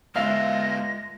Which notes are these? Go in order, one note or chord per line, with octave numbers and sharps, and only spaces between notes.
G#3 B3 F4 E5 F5 F6 A#6